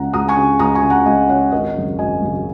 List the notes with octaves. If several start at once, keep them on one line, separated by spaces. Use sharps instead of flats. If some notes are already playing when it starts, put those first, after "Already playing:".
Already playing: C#2 C#3 F#5 A#5
C#2 A#5 D#6
G#5 C#6
C#3
C#2 A#5 D#6
G#5 C#6
C#3
F#5 A#5
C#2 D#5 G#5
C#3 C#5 F#5
G#1 A#4 D#5
F#2 C#3
G#1 D#5 G#5
F#2 C#3